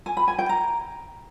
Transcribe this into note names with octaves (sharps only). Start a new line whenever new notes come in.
G#5
B5
G#5
G5
A#5